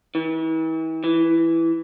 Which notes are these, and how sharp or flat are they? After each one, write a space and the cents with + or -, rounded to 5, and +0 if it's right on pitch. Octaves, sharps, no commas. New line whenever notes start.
E3 -40
E3 +5